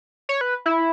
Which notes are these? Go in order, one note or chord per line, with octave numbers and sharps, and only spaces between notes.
C#5
B4
E4